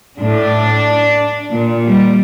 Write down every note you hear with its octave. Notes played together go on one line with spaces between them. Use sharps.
A2 D4
A#2
G3